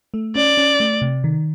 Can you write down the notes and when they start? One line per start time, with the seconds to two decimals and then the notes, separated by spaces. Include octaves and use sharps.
0.14 A3
0.36 C#4 D5
0.57 C#4
0.80 A3
1.02 C3
1.24 D#3